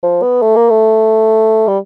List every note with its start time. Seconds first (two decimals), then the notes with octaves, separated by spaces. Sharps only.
0.03 F3
0.22 B3
0.42 A3
0.56 A#3
0.70 A3
1.68 G3